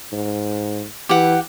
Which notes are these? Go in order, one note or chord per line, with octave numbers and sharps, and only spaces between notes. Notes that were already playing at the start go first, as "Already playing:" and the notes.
G#2
E3 G4 F#5